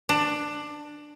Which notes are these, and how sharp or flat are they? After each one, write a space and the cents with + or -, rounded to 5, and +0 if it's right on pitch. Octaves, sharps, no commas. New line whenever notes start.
D4 +15